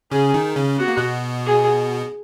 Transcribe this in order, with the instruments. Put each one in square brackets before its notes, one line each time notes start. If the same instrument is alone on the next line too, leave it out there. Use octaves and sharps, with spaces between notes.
[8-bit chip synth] C#3 C#4 [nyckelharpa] G#4
[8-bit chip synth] D#3 D#4
C#3 C#4
[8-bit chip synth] B3 [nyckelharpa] F#4
[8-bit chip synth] A#3
B2 B3
[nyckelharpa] G#4